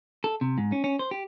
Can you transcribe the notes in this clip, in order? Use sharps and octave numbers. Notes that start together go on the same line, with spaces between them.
A4
C3
G#2
C#4
C#4
C5
G4